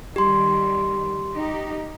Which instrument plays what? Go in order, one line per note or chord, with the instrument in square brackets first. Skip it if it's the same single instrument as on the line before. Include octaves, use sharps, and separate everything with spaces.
[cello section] D#3 G3 [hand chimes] G4 C6
[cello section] D#4 G4